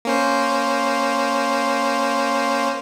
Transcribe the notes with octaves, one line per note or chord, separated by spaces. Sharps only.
A#3 C#4 C5